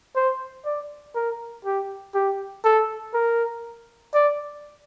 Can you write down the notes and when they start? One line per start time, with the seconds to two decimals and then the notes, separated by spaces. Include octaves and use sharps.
0.16 C5
0.65 D5
1.15 A#4
1.65 G4
2.15 G4
2.64 A4
3.14 A#4
4.14 D5